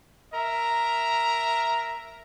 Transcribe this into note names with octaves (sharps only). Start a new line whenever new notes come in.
A#4 E5 A#5